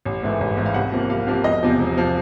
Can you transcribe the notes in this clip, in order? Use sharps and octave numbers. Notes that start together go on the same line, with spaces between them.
A1
G#2 E3 A3
A1
G#2 E3 A3
F5
C2 F#5
C3 F3 A#3
C2 F5
C3 F3 A#3
E1 D#5
E2 C3 F3
E1
C3 F3